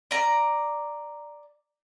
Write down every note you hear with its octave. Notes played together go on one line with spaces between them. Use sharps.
D5 A#5